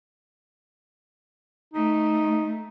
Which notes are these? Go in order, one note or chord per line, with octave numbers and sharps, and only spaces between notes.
A3 D#4